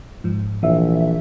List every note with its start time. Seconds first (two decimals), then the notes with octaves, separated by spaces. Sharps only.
0.24 G#2 F3
0.63 A#1 E3 E5